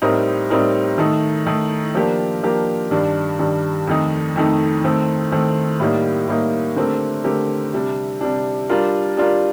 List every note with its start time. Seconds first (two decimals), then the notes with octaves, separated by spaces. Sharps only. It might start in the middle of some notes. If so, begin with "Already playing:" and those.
0.02 A2 G3 C4 D#4 A#4
0.50 A2 G3 C4 D#4 A#4
0.98 D#3 A3 D#4
1.46 D#3 A3 D#4
1.95 F3 A#3 D4 G4 A#4
2.43 F3 A#3 D4 G4 A#4
2.91 G2 D#3 G3 D4
3.39 G2 D#3 G3 D4
3.87 F2 D#3 A3 D#4
4.36 F2 D#3 A3 D#4
4.84 D#3 A3 C4
5.32 D#3 A3 C4
5.80 A2 G3 A#3 D#4
6.28 A2 G3 A#3 D#4
6.76 D3 A3 C4 G4 A#4
7.24 D3 A3 C4 G4 A#4
7.73 C3 G3 D4
8.21 C3 G3 D4
8.70 G3 D4 F4 A#4
9.17 G3 D4 F4 A#4